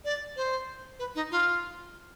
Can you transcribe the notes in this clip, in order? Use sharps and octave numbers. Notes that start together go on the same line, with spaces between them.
D5
C5
B4
D#4
F4